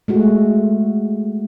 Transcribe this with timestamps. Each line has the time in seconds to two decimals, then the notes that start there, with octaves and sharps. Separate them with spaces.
0.08 G#3 A3 F#4